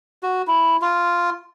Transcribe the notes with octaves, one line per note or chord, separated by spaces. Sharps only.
F#4
E4
F4